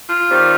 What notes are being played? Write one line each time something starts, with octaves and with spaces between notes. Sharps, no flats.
F4
D#3 G3 C4